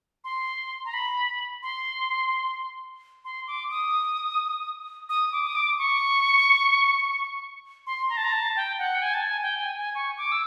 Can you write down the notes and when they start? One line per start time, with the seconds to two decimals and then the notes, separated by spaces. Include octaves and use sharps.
0.24 C6
0.85 A#5
0.93 B5
1.63 C6
3.25 C6
3.47 D6
3.71 D#6
5.09 D#6
5.32 D6
5.47 D#6
5.55 D6
5.78 C#6
7.86 C6
8.09 A#5
8.17 A5
8.24 A#5
8.33 A5
8.56 G5
8.78 F#5
8.95 G5
9.02 G#5
9.14 A5
9.25 G#5
9.42 G5
9.59 G#5
9.78 G#5
9.95 C#6
10.18 D6
10.32 E6